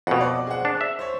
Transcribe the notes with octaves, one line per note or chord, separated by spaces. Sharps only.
F2 B2 F#5
D5 D#5 D6
G#4 C5 F#5
D4
E5
C5 C#5